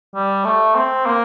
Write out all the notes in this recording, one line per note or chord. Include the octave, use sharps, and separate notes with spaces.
G3
A3
C4
A#3